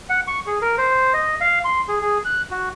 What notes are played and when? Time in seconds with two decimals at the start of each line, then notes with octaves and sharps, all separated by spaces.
0.10 F#5
0.28 C#6
0.47 G#4
0.62 A#4
0.78 C5
1.14 D#5
1.41 F5
1.65 C6
1.89 G#4
2.02 G#4
2.25 F#6
2.51 F#4